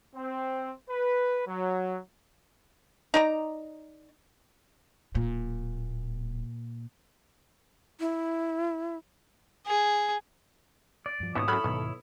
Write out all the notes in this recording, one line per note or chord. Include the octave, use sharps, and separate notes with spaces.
C4
B4
F#3
D#4 D5 A#5
D1 A#2
E4
G#4
D5
G2 F3
D#2 G#2 B2 C#4 E4 C#5 D#6
F#2 F#3 A4 B5 F6
B1 G#2 B2 D#3